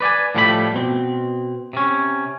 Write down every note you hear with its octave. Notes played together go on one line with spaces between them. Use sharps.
B4 D5 G5 G#5
A2 F3 G3 A3 A#4 B5
B2 C4
C3 C#4